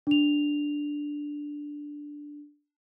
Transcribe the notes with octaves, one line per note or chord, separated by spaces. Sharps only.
D4 F7